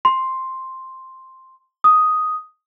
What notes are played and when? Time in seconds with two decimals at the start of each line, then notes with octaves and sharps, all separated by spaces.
0.05 C6
1.84 D#6